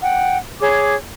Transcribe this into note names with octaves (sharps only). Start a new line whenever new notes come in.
F#5 G5
G#4 C#5 D6